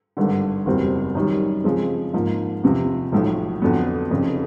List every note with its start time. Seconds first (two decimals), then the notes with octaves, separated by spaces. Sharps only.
0.17 G#1 G2 D3
0.66 F#1 E2 B2 G3 C4
1.15 F#2 D#3 G3
1.64 C#3 F3 G#3 C4
2.13 G#2 F3 A#3
2.64 E2 C3 F3
3.12 B1 A2 F3
3.62 F2 D3 F#3 B3
4.11 F1 F2 C#3